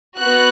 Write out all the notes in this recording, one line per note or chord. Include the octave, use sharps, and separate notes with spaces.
B3 F#4 F#6